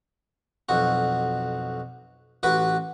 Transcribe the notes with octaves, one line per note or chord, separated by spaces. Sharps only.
B1 F2 F#4
A1 F#4 B4 D6